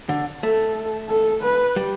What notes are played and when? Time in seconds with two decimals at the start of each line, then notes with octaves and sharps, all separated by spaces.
0.09 D3
0.42 A3 A4
1.09 A4
1.43 B4
1.76 G3